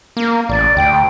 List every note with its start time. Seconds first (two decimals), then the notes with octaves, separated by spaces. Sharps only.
0.17 A#3
0.49 A1 D5
0.77 D2 G5